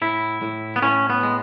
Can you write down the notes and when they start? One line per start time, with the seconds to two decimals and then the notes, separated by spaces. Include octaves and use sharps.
0.02 A2 E4
0.42 A2
0.76 B3
0.82 A2 C#4
1.10 B3
1.23 G#3